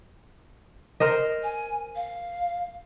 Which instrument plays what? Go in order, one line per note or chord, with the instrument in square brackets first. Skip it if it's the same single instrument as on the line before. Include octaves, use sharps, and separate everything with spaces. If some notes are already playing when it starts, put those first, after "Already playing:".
[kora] A#4 C5 D#5
[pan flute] G#5
F5